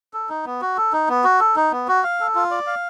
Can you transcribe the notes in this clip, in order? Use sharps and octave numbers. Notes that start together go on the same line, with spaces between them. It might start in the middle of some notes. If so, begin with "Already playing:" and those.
A4
D#4
B3
F#4
A4
D#4
B3
F#4
A4
D#4
B3
F#4
F5
A4
F4
D5
F5